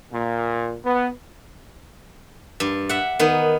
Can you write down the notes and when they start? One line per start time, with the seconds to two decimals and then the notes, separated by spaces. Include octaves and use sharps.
0.12 A#2
0.85 B3
2.60 G2
2.89 E5 F#5
3.19 D#3 B3